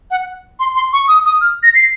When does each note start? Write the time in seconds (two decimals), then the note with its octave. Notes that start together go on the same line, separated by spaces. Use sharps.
0.11 F#5
0.59 C6
0.75 C6
0.93 C#6
1.08 D#6
1.25 D#6
1.41 F6
1.63 A#6
1.75 C7